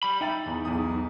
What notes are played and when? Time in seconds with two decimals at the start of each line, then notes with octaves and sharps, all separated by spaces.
0.03 G3 B5
0.21 D#4 E5 G5 A6
0.46 E2
0.65 B1 E2 D#6